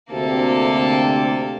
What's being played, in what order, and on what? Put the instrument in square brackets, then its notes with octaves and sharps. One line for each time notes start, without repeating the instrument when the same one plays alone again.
[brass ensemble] D2 C3 [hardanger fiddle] A#3 A4